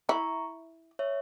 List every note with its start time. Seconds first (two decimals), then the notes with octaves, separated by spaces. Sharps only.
0.09 E4 A#5 C#6
0.99 C#5 E5